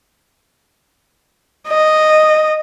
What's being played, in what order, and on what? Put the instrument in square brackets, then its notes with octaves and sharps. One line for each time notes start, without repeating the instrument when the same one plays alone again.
[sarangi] D#5